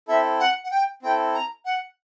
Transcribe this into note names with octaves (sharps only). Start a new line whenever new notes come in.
C4 E4 A4 E5
F#5
F#5
G5
C4 E4 A4 G5
A#5
F#5